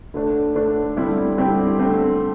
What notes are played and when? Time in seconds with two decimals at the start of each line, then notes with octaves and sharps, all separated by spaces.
0.14 D3 A3 D4
0.55 D3 A3 D4
0.97 D3 G3 C4 E4 G4
1.38 D3 G3 C4 E4 G4
1.79 D3 A3 C4